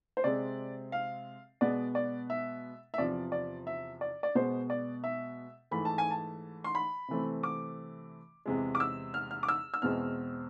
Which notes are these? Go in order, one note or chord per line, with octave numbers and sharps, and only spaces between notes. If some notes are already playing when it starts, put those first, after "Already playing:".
C5
C3 G#3 C4 D5
F5
B2 G#3 B3 D5
D5
E5
E5
E2 C3 F3 D5
D5
E5
D5
D5
B2 G#3 B3 C5
D5
E5
G#2 E3 A3 B5
A5
G#5
A5
C6
B5
C3 E3 A3 C4
D6
E2 C3 G#3
D6
E6
F6
F6
D6
E6
E6
E2 B2 G#3 C4 F6